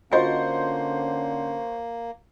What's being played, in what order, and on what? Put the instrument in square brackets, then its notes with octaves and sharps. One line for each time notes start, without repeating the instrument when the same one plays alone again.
[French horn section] D3 C#4 [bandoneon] A#3 [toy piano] F4 D#5 G#5 [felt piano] F#4 C5